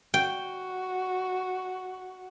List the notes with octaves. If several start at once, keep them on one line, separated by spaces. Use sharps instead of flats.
F#4 G5